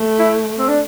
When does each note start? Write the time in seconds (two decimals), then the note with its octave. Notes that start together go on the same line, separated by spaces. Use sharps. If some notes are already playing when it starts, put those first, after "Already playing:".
Already playing: A3
0.19 E4
0.59 C4
0.69 D4